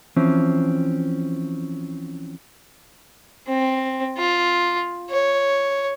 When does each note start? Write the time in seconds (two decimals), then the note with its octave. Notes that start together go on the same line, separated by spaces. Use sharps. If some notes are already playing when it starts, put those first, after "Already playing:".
0.16 E3 F3 C4 C#4
3.48 C4
4.18 F4
5.10 C#5